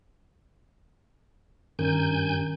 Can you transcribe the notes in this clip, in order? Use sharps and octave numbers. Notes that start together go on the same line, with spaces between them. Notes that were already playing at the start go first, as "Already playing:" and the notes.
G2 D#3 C#4 A#4 G#5 G6